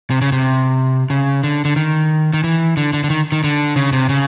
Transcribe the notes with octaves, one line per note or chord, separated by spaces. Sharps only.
C3
C#3
C3
C#3
D3
D3
D#3
D#3
E3
D3
D3
D3
D#3
D#3
D3
C#3
C3
C#3